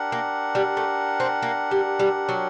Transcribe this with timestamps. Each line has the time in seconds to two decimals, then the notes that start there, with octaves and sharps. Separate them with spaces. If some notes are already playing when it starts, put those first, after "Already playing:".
Already playing: D4 G4 A#4 F#5
0.12 A#3
0.55 G3
0.77 A3
1.20 C4
1.42 A#3
1.71 G3
2.00 G3
2.29 F#3